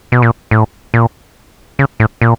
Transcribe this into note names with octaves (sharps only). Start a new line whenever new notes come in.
B2
A#2
A2
A#2
C#3
A2
A#2